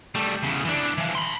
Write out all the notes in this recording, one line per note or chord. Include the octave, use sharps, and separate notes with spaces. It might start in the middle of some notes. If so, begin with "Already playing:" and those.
G3 A3
E2 C#3
E3 D4
E3 F3
B5 C6